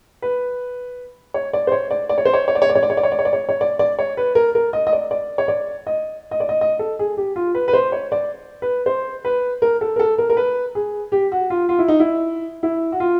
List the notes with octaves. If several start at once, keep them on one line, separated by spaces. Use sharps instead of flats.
B4
C#5
D5
C5
C#5
D5
D5
C#5
C5
C#5
C#5
D5
C#5
D5
C#5
D5
C#5
D5
C#5
D5
C#5
D5
C#5
C#5
D5
D5
C#5
B4
A#4
A#4
D#5
D#5
D5
D5
C#5
D5
D#5
D#5
D5
D#5
D#5
A4
G#4
G4
F4
B4
B4
C5
C#5
D5
B4
C5
B4
A#4
A4
A#4
A4
A#4
A#4
B4
G#4
G4
F#4
F4
F4
E4
D#4
E4
E4
F#4
F4